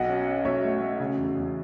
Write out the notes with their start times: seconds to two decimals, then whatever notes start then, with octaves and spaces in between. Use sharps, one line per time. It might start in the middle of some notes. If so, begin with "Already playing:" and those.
Already playing: B1 D#5 F#5
0.09 C#4
0.28 C#4
0.45 B1 C#5 E5
0.63 A3
0.81 A3
1.00 C#3
1.18 E2
1.37 E2